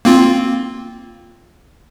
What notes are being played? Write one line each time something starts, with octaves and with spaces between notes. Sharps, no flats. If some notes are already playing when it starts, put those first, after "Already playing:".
A#3 C4 F4